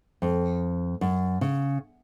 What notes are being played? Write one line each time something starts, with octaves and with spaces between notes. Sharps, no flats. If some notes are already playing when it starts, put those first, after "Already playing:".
F2
F#2
C#3